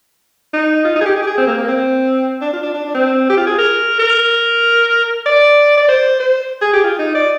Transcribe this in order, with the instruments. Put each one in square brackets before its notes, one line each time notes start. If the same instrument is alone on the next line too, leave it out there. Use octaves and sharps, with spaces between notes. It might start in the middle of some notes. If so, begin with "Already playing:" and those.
[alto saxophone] D#4
F4
D#4
G#4
G4
G#4
G4
G#4
C4
A#3
A#3
C4
D4
F4
D4
D4
D4
C4
G4
F4
G#4
A#4
A#4
D5
D5
C5
C5
G#4
G4
F4
D#4
D5